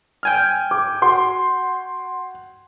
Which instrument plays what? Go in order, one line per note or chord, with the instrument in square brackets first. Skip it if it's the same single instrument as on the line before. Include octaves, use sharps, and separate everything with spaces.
[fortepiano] G5 G#5 F6
[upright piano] D6
F#4 F#5 C6